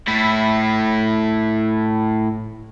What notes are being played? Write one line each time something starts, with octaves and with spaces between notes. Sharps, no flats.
A2 E4